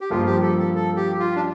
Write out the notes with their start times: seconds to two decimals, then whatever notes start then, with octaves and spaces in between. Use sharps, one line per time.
0.01 G4
0.10 G2 F3 A#3 F4
0.26 G4
0.42 A4
0.59 A4
0.75 A4
0.96 G4
1.19 F4
1.36 D4